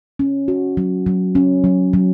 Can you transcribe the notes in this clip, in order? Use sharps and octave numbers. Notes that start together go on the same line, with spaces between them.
C#4
F#4
F#3
F#3
C#4
F#3
F#3